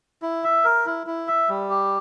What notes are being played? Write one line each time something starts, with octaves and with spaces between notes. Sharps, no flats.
E4
E5
A#4
E4
E4
E5
G3
G4